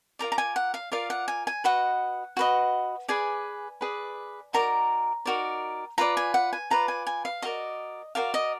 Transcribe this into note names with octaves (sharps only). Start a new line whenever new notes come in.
F4 A#4 D5 A#5
A#5
G#5
F#5
F5
F4 A#4 D5 F5
F#5
G#5
G#5
F#4 B4 D#5 F#5
F#4 B4 D#5
G#4 B4 D5 G#5
G#4 B4 D5
D#4 F#4 A#4 D5 A#5
D#4 F#4 A#4 D5
F4 B4 D5 A#5
G#5
F#5
G#5
F4 B4 D5 A#5
G#5
G#5
F5
F#4 A#4 D5 D#5
F#4 A#4 D5 F5
D#5